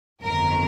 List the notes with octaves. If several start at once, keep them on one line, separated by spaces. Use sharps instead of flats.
G1 F2 D#3 A#4